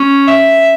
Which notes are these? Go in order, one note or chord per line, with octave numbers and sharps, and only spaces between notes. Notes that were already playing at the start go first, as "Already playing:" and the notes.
Already playing: C#4
E5